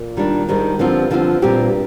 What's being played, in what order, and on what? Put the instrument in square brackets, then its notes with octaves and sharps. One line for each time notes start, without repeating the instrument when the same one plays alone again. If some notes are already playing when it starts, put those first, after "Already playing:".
Already playing: [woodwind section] A#2
[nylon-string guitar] D#3 G3 D4
[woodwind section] G#2 [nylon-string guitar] D#3 G3 D4
[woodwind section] G2 [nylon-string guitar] D3 F3 C4 F4
[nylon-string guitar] D3 F3 C4 F4
[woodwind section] G2 [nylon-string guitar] A#2 G3 C4 G4